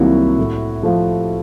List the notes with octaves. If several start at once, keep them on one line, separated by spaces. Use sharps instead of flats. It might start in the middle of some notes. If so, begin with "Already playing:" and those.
Already playing: C2 C3 D#3 F#3 A#3 E4 F#4
A2
F3 A3